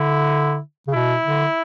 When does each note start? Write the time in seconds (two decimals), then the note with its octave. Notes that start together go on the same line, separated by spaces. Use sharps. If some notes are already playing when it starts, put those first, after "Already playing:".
Already playing: D3 E4
0.88 C#3
0.94 B2 E4
1.25 D3